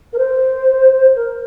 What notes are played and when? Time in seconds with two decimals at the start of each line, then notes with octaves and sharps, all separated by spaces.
0.13 A#4
0.18 C5
1.15 A#4